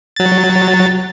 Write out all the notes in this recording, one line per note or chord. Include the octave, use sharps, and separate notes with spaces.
F#3 A6